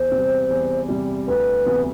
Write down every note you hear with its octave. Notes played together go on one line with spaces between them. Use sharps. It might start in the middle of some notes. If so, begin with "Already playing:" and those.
Already playing: E2 C5
C3 G3
E2
C3 G3
D2 B4
C3 E3 B3